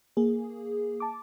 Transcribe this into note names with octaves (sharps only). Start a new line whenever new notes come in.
A#3 G#4
A5 D6